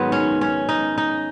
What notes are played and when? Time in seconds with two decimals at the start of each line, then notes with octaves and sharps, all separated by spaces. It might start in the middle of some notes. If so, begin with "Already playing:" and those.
Already playing: G#2 D#3 F#3 B3
0.12 C#4
0.41 C#4
0.69 D#4
0.98 D#4